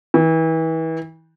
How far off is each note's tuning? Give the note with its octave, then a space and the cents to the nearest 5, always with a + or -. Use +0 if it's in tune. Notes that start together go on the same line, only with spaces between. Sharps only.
E3 -30